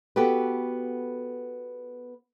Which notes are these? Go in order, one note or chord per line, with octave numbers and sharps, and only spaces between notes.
B3 F#4 G4 A4 B4